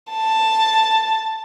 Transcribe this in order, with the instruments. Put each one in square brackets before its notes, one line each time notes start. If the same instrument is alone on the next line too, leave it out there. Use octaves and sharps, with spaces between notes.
[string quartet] A5